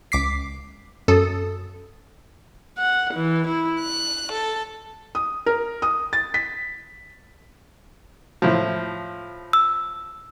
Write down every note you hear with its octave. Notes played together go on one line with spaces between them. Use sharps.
C#2 D6 B6 C7
F#2 A4 D#6
F#5
E3
E4
F#6
A4
D#6
A#4
D#6
A6
B6
A2 F3
E6